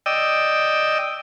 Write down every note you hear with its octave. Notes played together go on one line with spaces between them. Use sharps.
D5 D#5 G5 E6